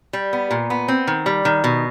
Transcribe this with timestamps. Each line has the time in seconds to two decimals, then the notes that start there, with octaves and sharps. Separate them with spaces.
0.13 G3
0.33 B3
0.51 A#2
0.70 B3
0.88 C4
1.07 D#3
1.26 G3
1.45 D#3
1.64 B2